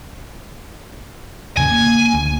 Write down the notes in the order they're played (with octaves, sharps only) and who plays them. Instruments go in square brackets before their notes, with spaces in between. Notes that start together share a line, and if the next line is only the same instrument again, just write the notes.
[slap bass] D#2 C#3 [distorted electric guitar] G#5
[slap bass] A#3
D2